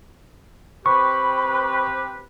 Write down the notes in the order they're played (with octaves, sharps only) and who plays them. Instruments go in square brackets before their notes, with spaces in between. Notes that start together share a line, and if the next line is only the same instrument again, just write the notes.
[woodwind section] C4 G4 B4 [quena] B5 [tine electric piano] C#6